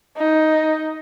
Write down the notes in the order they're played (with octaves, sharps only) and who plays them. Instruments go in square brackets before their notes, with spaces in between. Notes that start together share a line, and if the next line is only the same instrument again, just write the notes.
[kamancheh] D#4